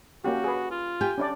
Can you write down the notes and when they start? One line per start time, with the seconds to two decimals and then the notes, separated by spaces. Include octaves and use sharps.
0.24 A#3 C#4 F#4 G4
0.44 G#4 B4
0.71 F4
1.01 G4 G5 G#5
1.18 C#4 D4 D5